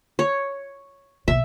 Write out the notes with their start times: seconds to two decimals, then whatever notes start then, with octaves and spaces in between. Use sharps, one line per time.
0.19 C#5
1.28 A#1 B2 E5